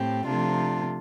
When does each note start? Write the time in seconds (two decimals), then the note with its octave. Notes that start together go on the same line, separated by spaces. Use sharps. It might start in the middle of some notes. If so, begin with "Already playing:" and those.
Already playing: A2 C4 G4
0.27 C3 F3 A3 D4 F4